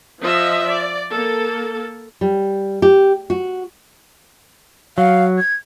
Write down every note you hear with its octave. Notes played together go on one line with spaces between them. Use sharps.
F3 D#5 E5
D5
A#3 A4
G3
G4
F#4
F#3 F5
G#6